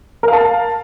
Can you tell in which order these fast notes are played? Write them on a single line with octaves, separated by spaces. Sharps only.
A#4 F5 A5